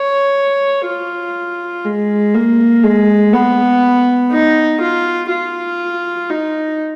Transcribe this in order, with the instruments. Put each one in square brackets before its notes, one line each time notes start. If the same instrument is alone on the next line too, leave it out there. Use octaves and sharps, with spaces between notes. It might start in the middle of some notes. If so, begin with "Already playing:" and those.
Already playing: [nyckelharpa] C#5
F4
G#3
A#3
G#3
B3
D#4
F4
F4
D#4